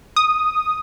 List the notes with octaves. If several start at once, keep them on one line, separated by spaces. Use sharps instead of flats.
D#6